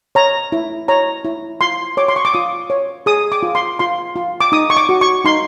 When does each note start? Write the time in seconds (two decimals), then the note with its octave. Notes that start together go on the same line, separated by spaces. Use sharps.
0.15 C#5 A#5
0.52 E4
0.88 C#5 A#5
1.25 E4
1.61 F4 C6
1.97 C#5 D6
2.08 C6
2.16 C#6
2.25 D6
2.34 F4 D#6
2.70 C#5
3.06 G#4 D#6
3.32 D6
3.43 F4
3.55 C6
3.79 F4 C6
4.16 F4
4.41 D6
4.52 D#4 D#6
4.70 C#6
4.77 D6
4.89 F#4
5.01 C#6
5.25 D#4 C6